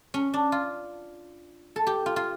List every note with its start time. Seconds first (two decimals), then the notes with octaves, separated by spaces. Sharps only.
0.14 C#4
0.34 D4
0.52 F4
1.76 A4
1.87 G4
2.06 F4
2.16 F4